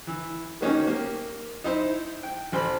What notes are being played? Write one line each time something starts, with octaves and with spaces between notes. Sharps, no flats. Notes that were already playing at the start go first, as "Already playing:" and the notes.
E3
D#3 F#3 A#3 C#4 D#4 G4
A#3 G4
D#4 E4 C5
G5
A1 C5 B5